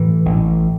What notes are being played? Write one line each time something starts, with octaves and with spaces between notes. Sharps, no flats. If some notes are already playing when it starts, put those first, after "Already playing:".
Already playing: A2 E3
A1